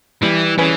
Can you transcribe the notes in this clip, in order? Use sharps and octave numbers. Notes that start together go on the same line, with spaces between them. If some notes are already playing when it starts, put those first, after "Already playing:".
E3 G3
E3 C#4 G#4 B4